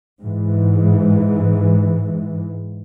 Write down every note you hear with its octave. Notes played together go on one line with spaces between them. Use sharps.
G#2 E3